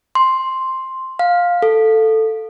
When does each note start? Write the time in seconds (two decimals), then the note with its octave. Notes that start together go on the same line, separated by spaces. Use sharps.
0.15 C6
1.19 F5
1.62 A4